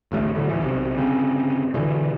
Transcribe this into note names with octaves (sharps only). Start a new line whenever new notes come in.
A1 D2 A2 A3
A2 D3 F#3
C#2 E3
B1 C3
G1 C#3 C4
B2 D3 E3